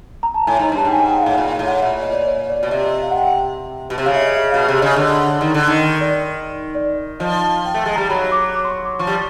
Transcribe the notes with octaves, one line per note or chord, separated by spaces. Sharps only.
A#5
A5
A2 G#5
G#2 A#5
G2
A5
G#2 G5
G#5
G5
F#5
F5
A2
A#2 F5
F5
A2
F#5
A#2 E5
D#5
D5
C#5
D5
B2
D#5
C3 D5
D#5
F5
F#5
G5
B2
C3
C#3 F5
E5
D#5
E5
B2 F5
C3 E5
C#3 D#5
D3
D#3
D3
D#3
D5
D5
F3 D#5
G5
A3
G#3
G3 A#5
F#3 B5
D6
D6
C6
C#6
D6
F3 C#6
G3